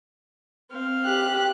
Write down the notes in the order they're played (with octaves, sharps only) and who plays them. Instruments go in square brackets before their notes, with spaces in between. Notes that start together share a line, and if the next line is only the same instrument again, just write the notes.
[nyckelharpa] C4 F5
[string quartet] G4 [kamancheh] F#6